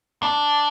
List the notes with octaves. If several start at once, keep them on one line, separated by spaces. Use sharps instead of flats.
D4